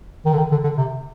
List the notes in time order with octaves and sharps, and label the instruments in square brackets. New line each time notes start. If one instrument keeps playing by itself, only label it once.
[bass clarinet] D#3
D3
D#3
D3
D3
C3